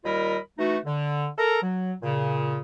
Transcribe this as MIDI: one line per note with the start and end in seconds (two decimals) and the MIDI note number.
0.05 0.38 39
0.05 0.38 55
0.05 0.38 65
0.05 0.38 70
0.05 0.38 75
0.05 0.38 83
0.58 0.78 52
0.58 0.78 57
0.58 0.78 63
0.58 0.78 66
0.86 1.28 50
1.38 1.61 69
1.38 1.61 70
1.38 1.61 82
1.62 1.93 54
2.02 2.61 46
2.02 2.61 49